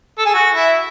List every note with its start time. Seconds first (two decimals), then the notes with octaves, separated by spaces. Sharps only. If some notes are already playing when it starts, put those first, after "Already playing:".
0.18 A4
0.25 G#4
0.34 F#4
0.55 E4